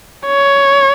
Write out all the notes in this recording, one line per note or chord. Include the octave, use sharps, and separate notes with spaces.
C#5